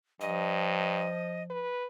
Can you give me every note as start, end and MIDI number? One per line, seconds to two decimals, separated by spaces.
0.21 1.09 43
0.21 1.71 53
0.21 1.43 75
1.50 1.87 71